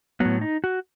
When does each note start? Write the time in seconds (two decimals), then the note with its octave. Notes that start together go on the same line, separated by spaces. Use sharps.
0.20 A2 F#3 B3
0.41 D#4
0.64 F#4